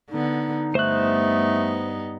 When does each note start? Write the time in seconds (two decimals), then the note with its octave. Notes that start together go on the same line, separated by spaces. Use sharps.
0.11 D3 B3 D#4
0.75 G2 A3 B3 D#4 C5 F#6